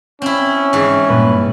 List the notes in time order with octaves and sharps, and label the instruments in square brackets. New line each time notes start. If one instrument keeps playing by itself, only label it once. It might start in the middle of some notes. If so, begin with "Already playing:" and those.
[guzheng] C4 E4 [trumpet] C#4
[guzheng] G#2 E3
[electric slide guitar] G2 A#2 B4